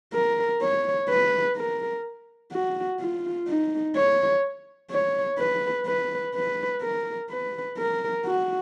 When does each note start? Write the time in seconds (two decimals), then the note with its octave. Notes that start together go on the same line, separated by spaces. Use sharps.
0.14 A#4
0.62 C#5
1.10 B4
1.57 A#4
2.52 F#4
3.00 F4
3.48 D#4
3.96 C#5
4.91 C#5
5.39 B4
5.87 B4
6.35 B4
6.82 A#4
7.30 B4
7.78 A#4
8.25 F#4